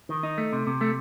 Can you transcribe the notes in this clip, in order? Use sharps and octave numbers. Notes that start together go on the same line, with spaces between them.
D#3
D#4
A3
C3
C3
A3